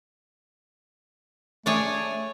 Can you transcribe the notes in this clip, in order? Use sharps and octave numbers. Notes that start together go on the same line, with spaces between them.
A3 G#4 C#5 D5